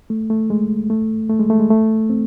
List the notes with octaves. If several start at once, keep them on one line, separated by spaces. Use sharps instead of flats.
A3
A3
G#3
A3
A3
G#3
A3
G#3
A3
C4